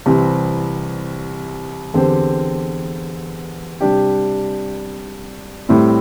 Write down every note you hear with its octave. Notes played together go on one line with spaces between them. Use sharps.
C2 C3 E3 C4
E2 D3 C4 G4 C5
C3 G3 D4 G4
A2 G3 C4 E4